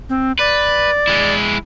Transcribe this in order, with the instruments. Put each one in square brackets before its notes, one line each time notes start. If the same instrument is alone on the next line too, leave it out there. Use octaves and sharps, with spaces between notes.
[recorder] C4
[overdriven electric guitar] B4 [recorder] D5
[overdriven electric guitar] G#3 E4